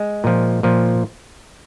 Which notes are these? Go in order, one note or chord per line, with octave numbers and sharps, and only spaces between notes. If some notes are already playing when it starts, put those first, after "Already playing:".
Already playing: G#3
A#2 F3
A#2 F3